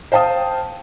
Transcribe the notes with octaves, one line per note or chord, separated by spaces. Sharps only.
C5 F5 G5 A5 D#6